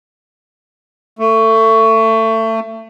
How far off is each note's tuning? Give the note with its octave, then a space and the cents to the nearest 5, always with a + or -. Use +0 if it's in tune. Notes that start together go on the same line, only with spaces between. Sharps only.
A3 +25